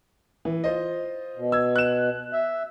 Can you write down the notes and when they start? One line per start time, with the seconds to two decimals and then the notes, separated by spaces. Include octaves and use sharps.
0.45 E3
0.64 F4 C5 D#5
1.36 B2
1.52 E6 G#6
1.76 F#6 E7
2.33 E5